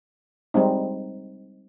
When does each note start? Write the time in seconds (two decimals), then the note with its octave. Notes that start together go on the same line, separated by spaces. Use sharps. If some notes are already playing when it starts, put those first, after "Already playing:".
0.54 G3 G#3 C4 D#4